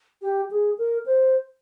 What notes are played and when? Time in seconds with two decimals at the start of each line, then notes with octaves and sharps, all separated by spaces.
0.22 G4
0.51 G#4
0.78 A#4
1.06 C5